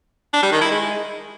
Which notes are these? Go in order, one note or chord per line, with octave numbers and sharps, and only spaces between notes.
D4
G3
D#3
E4
G#3